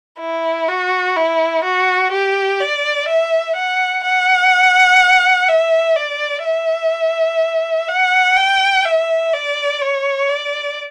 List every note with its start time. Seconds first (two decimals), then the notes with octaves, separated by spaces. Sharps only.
0.19 E4
0.68 F#4
1.16 E4
1.64 F#4
2.12 G4
2.60 D5
3.08 E5
3.56 F#5
4.04 F#5
5.48 E5
5.96 D5
6.44 E5
7.88 F#5
8.37 G5
8.85 E5
9.33 D5
9.82 C#5
10.28 D5